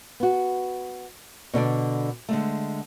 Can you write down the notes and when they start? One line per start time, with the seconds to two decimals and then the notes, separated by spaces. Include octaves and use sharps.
0.20 B3 F#4
1.54 B2 D3 A4 D5
2.29 D3 G#3 A3